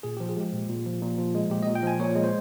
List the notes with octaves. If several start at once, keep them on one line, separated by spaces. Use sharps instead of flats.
A#2 G#4
F3 G4
G#4
G#3 G4
A#2
A#2
F3
A#2
F3
G#3
A#2 G4
A#2 D#5
G5
F3 G#5
A#2 C#5
G#3
C5